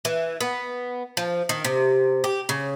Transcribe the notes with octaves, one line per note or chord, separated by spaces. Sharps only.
E3
B3
F3
D#3
C3
G4
C#3